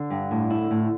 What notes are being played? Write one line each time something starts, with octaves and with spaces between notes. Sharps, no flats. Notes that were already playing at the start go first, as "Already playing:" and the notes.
Already playing: D3
G2
A2
E4
A2